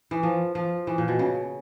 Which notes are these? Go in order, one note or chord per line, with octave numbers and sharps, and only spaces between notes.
E3
F3
F3
E3
A#2
B2
C#3